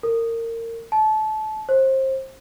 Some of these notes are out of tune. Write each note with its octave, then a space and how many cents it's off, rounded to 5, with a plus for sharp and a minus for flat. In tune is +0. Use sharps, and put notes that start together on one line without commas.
A#4 -25
A5 -25
C5 +25